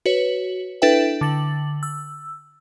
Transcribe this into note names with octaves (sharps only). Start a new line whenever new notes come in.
F#4 B4 C#5
D4 E4 A4 B4 E5 G5
D3 A6 F#7
E6